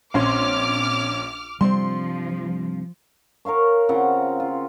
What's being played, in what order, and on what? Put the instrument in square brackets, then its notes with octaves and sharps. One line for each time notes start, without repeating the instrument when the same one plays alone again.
[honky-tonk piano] A#1 C#4 C6 [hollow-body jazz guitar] C4 C#5 F5 [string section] D6 F6
[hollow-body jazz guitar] G2 C3 C4 [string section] F3 [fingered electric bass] G3 [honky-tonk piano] C6
[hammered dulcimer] A#4 C#5 F5 C#6
C#3 C4 F4 F#5
F4